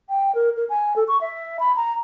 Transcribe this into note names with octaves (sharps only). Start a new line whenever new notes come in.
G5
A#4
A#4
G#5
A4
C#6
E5
B5
A#5